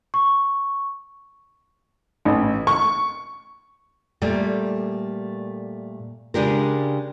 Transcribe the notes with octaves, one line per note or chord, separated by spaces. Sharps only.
C#6
A1
C#6
A#2 G3 A3
C#3 G#3 D4 G4 A#4